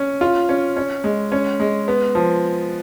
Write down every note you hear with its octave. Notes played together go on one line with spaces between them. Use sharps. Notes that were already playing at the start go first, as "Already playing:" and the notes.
Already playing: C#4
F4
C#4
C#4
G#3
C#4
G#3
B3
F3